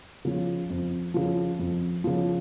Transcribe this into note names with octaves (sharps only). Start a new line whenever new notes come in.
C#3 F3
F2
C#3 F3
F2
C#3 F3